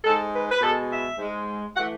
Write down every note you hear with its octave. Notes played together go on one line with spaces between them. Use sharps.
G#2 G#3 A4
B4
B4
B2 G#3 A4
E5
G#2 G#3
F#5
E3 A3